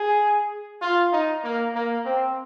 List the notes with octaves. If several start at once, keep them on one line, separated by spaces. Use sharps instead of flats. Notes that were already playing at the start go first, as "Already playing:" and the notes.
Already playing: G#4
F4
D#4
A#3
A#3
C4